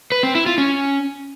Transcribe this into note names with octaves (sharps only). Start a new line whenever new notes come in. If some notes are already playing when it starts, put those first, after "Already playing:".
B4
C4
E4
F4
C#4